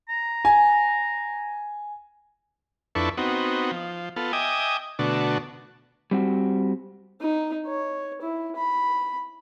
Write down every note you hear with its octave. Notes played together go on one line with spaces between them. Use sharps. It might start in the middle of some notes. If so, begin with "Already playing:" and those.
A#5
G#5
F2 D4 E4 A4 B4 C#6
B3 C4 D#4 F#4
F3
B3 F4 A4
D#5 E5 G5 G#5 D6 D#6
B2 D3 A3 D4 F#4
G3 C4 F#4
D#4
C#5
E4
B5